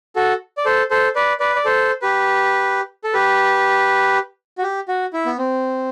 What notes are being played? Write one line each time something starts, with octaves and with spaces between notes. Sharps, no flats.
F#4 A4
D5
A4 C5
A4 C5
B4 D5
B4 D5
D5
A4 C5
G4 B4
A4
G4 B4
F#4
G4
F#4
E4
B3
C4